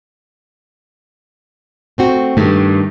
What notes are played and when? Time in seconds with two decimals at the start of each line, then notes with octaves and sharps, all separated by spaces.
1.98 A3 C4 F#4
2.37 G2 D#3 A3